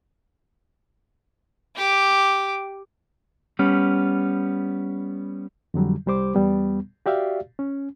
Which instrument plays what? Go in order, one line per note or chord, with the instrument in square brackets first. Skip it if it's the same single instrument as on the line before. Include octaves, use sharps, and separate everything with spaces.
[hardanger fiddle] G4 D6
[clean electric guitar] G3 B3 C#4
[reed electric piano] F2 D3 F#3 G3
C2 G3 G4 C5 D6
E2 G3 B3
F#4 G4 D5 E5 F5
C#4